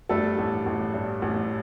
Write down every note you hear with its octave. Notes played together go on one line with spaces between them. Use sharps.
G2 A3 A4
A1
A1
G2
A1